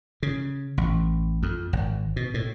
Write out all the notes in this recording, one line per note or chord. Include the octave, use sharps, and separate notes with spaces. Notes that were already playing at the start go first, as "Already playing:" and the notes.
C#3
A1
F2
G#1
B2
A2